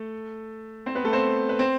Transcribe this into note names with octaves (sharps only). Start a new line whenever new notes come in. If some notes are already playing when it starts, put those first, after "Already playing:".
Already playing: A3 A4
C4 C5
B3 B4
A3 A4
C4 C5
B4
C4 C5